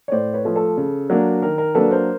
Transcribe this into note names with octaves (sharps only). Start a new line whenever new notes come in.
C#5
A2 C5 D5
B4 C#5
F3 A3
A4
C#3
F#3 A#3 D4
D#3 A#4
A#4
F#3 A#3 D4 A4 B4
A#4 C5